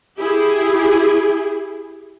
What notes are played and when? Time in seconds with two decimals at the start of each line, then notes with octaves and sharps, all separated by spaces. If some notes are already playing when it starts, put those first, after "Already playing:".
0.20 E4 G4 G#4